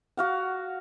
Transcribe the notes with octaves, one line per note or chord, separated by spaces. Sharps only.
F#4 F5 F#5